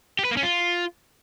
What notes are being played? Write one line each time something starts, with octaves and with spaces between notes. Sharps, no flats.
G4
B4
A#3
C#4
F4